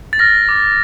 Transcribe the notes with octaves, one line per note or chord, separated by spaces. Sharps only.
A6
F6 A#6
D6